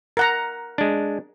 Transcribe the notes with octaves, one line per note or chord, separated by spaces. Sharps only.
A#4 F#5 A#5
G#3 D4